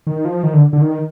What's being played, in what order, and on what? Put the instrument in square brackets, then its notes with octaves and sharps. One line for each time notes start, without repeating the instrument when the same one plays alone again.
[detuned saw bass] D#3
F3
D#3
D3
D3
D#3